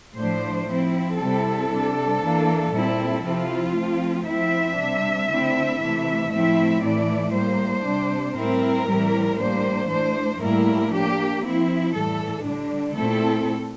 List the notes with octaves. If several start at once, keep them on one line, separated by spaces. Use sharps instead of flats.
A2 F3 A3 D4 C5
F3 C4 E4
C3 G3 C4 E4 A4
C3 G3 D4
E3 A#3 D4
A#2 G3 C4 E4
C3 F3 C4 E4 F4
F3 A3 C4
F3 C4 E4 E5
C3 G3 D4
D3 A3 C4 E4
C3 E3 A3 E4
A2 F3 A3 C4 E4 E5
A2 E3 A3 E4 D5
A2 G3 A#3 C5
C3 G3 D4
A2 G3 C4 E4 A#4
A2 E3 G3 C4 E4
A2 G3 A#3 D4 C5
E3 A3 D4 C5
A2 G3 A#3 E4 A#4
F3 A#3 D4 G4
F3 C4 E4
A2 E3 G3 A4
D3 G3 D4
A#2 A3 C4 E4 A4